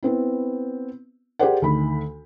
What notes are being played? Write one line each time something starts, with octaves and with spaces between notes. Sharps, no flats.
B3 C4 E4
G4 G#4 A#4 C5 D5 F#5
D2 D#3 B5